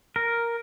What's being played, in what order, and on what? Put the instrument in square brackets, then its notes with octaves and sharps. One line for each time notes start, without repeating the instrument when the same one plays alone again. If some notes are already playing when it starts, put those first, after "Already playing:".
[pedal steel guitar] A#4